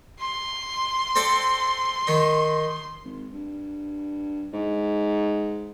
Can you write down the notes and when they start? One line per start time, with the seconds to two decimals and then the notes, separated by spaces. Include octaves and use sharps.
0.21 C6
1.16 C4 A4 D5
2.07 D#3 D#4
3.04 G#1
3.33 G2
4.53 G#2